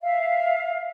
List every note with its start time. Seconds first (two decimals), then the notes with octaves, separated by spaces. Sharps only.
0.01 E5 F5